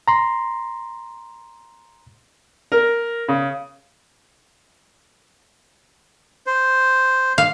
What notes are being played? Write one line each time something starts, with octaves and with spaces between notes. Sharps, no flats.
A#5 C6
A#4
C#3
C5
F5